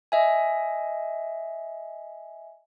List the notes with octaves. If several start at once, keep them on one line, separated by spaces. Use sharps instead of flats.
D#5 E5 G#5